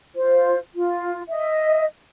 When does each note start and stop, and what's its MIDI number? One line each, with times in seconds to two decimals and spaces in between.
0.15 0.58 65
0.15 0.58 72
0.75 1.21 65
1.29 1.84 75
1.29 1.84 76